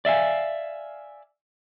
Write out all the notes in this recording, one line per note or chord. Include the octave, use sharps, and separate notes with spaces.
D5 E5 F5 G#5